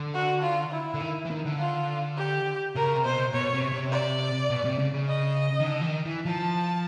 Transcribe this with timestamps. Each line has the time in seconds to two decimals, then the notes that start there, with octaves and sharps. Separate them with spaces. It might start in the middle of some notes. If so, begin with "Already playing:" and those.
Already playing: D3
0.14 F#4
0.42 F4
0.72 E4
0.94 D3
1.01 D#3
1.25 E3
1.30 D#3
1.45 D3
1.59 F4
2.17 G4
2.75 C#3 A#4
2.95 C3
3.05 B2 C5
3.34 B2 C#5
3.54 C3
3.73 C3
3.92 D5
4.50 B2
4.65 C3
4.79 C#3
4.94 C#3
5.08 D#5
5.59 D#3
5.66 D3
5.81 E3
5.86 D#3
6.05 E3
6.25 F3 A5